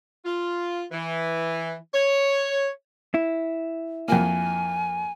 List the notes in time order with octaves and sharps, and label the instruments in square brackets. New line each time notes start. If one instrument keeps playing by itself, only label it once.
[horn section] F4
E3
C#5
[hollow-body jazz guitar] E4
[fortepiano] F2 A#3 [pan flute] G#5